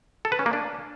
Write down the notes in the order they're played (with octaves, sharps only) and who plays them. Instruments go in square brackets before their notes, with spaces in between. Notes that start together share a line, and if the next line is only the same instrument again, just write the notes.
[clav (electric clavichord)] A4
B4
C#4
A#3
D4